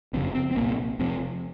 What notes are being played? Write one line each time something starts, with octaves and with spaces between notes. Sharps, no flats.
F#1 F2 C#3 C4
C4
C4
C2 A#2 A#3
F1 F2 C3 C4